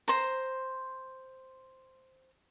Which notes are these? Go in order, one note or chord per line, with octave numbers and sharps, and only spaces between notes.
C5 A#5